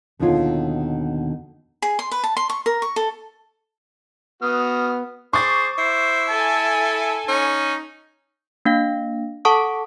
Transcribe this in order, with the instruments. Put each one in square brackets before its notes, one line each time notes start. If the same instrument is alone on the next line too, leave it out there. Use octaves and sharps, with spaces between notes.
[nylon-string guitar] D#2 B2 D3 D#3 F4 C#5
[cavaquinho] G#4
C6
B4
A5
C6
C#6
A#4
C#6
A4
[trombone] B3 [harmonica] F#4 F6 [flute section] D#6
[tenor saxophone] G#4 [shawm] C5 [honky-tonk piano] C#6 D6 A6
[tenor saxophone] E4 [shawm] C5
[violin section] A4 G#5 [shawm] A5
[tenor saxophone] C#4 [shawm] D#4
[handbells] A#3 D4 F5
A4 F#5 A5 C#6 D#6